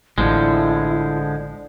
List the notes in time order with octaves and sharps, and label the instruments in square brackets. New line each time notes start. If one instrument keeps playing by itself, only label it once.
[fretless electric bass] A1 [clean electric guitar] D3 F3 G#3 [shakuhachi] E4